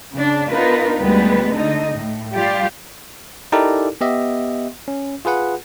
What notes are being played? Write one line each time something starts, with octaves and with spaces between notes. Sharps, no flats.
C#3 D4
B3 D4 D#4 F4 A#4 B4
D2 G3 G#3 B3 B4
D3 D#4 D#5
A2
G3 F4 G4 D5 F5
D#4 E4 G4 A4 A#4 D5
B3 G4 D#5 E5
C#4
F4 G#4 B4 F#5